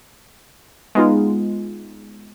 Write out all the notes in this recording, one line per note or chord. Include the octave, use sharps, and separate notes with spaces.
G#3 B3 D#4 F4